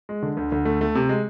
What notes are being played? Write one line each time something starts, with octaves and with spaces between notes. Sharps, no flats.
G#3
D3
D2
D2
A3
A3
C3
G#3